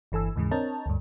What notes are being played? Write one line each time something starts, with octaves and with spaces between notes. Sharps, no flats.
G1 E3 A4 G#5 E6
D#2 G#2 C#3 E3 G#3
C4 D4 A#4 C#5 D#5 A5
D2 G2